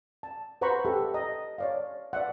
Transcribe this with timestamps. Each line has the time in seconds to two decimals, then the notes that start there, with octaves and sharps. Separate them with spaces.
0.23 A5
0.61 B4 C5 F#5 A#5 B5 C#6
0.85 G4 A4 E5
1.14 D#5 A#5
1.58 C#5 D5 F5
2.13 D5 E5 F#5